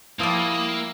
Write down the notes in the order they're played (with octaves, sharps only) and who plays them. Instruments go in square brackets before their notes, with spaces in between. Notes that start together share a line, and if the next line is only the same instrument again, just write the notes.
[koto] F3 G3 [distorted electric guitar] A#3 [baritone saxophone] E4 [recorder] D#6